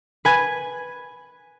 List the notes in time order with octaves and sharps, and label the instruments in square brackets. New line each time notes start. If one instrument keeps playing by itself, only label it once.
[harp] B4 G#5